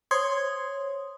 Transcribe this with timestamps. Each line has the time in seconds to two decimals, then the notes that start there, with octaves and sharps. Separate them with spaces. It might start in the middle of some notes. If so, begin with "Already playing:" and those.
0.11 C5 C#5 C6 D#6 G#6